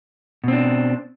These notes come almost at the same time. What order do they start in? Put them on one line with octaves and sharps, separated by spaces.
B2 C4 D4